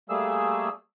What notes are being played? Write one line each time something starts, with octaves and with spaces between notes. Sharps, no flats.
G3 A3 A#3 G#4 E6